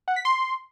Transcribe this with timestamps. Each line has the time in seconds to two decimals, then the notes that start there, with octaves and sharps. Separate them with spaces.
0.08 F#5
0.16 B6
0.25 C6